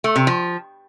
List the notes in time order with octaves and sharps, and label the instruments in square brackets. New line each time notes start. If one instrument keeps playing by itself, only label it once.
[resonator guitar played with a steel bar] A3
C3
F3